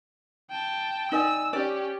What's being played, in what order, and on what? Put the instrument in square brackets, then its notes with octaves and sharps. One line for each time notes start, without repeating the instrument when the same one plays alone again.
[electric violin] G5 A5
[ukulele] D#4 D5 G#5 [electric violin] E6
[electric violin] C#4 G4 [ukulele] D5